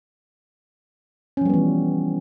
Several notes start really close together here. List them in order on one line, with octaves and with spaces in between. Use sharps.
C#4 F3 G3 B3 E3